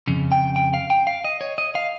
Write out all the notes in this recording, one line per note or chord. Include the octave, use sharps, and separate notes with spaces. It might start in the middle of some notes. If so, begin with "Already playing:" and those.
F2 C#3
G5
G5
F5
G5
F5
D#5
C#5
D#5
F5